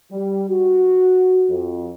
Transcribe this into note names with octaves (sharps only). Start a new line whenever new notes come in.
G3
F#4
F2